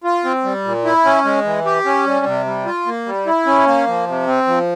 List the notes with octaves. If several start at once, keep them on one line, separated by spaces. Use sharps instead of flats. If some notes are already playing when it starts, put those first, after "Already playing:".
F4
C4
G3
A#2
E4
C#4
G#3
E3
G4
C#4
G3
C3
G3
F4
A#3
G3
E4
C#4
A#3
F3
C3
C4
F3